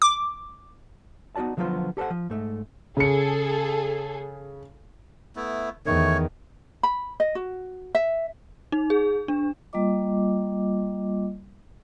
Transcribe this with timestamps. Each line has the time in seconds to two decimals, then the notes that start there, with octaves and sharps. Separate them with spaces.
0.02 D6
1.36 B3 D#4 F#4 D5 A5
1.57 D3 F3 F#3 B3 F4 C5
1.97 G4 A4 A#4 C5 F#5
2.10 F3
2.30 G#2 A3
2.97 C#3 G#4 A4 C#7
5.36 A3 B3 E4
5.86 E2 D#3 A3 C#5
6.83 B5
7.20 D#5
7.35 F#4
7.95 E5
8.72 D#4
8.90 G#4
9.28 D4
9.73 G3 A#3 F4 D#5 D6